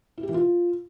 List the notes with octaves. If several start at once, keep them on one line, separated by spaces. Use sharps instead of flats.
E4
G4
E3
F4